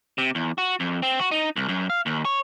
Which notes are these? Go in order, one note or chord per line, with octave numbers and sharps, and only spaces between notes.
C3
E2
F#4
F2
C4
F#4
D#4
C2
F#2
F5
D#2
C#5